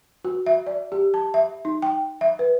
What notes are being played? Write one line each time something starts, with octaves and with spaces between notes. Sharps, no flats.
F#4
E5
D5
G4
A5
E5
D#4
G5
E5
B4